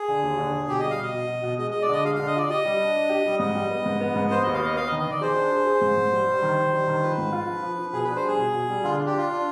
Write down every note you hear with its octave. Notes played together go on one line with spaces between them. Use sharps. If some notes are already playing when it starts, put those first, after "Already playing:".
Already playing: G#4
D3
D#2
D3
D3
B2 G4
G3 D#5
F5
B2 D#5
B2
B2
B2
G#3 D#5
G#3 D#5
D5
D3 D#5
G#3 F5
D3 F5
D#5
F4 D5
G4 D#5
G3
D4
D4
G4
G3
G#2 D#5
G3
B3
G#2
B3
G#2
B3 C5
D#2 D#5
F5
B3 D#5
B3 F5
D#5
D#3
D#5
D#3 D5
G#4 C5
D4
G#4
G#4
G#2
G#2
G3
G3
D#3
D#3
G3
D#3
F3 B4
G#2
F4
F3
F3
F3
B2 G#4
D4 B4
C5
G3 G#4
B2
B2
G3
D3 F4
D4
G4
D4 F4
D4